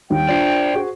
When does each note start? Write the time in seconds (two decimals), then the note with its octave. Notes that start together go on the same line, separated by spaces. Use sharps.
0.10 D#2 D#3 G3 G5
0.29 D4 F4 C5 D5
0.74 F#4 G#4 C5